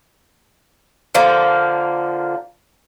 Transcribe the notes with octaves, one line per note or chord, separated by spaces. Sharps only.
D3 F3 A#3